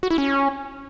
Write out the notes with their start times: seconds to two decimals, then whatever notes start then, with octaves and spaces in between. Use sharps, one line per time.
0.03 F#4
0.10 E4
0.18 C#4